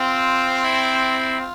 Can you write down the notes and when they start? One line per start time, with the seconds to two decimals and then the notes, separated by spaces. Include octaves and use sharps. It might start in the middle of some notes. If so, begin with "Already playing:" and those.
Already playing: C4 F4
0.64 E4
1.39 F4